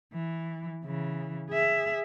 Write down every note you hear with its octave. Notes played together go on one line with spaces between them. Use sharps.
E3
C#3 E3
G#4 E5